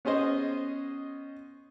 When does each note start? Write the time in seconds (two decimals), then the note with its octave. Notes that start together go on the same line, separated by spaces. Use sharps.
0.05 B3 C#4 G#4 C5 D#5